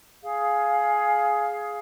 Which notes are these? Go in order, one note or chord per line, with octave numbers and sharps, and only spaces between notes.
G#4 F5